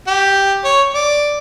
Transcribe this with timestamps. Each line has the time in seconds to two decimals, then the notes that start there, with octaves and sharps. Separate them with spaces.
0.07 G4
0.64 C#5
0.94 D5